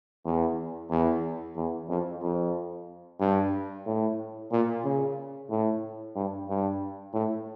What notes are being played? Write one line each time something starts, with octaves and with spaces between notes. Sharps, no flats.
E2
E2
E2
F2
F2
G2
A2
A#2
C#3
A2
G2
G2
A2